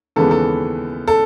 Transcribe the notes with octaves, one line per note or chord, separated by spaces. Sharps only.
D#2 C#3 E3 G#3 B3 A4
A4
A4